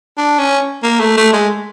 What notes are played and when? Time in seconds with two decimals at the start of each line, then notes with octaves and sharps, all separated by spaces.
0.18 D4
0.39 C#4
0.83 A#3
1.00 A3
1.17 A3
1.33 G#3